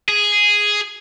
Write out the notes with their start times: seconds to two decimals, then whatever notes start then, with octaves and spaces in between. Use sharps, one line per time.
0.09 G#4